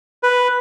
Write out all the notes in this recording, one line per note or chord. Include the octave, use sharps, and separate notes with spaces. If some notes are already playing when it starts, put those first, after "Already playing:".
B4